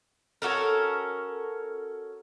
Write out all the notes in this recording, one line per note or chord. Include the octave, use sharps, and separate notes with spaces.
C#4 F#4 A4 A#4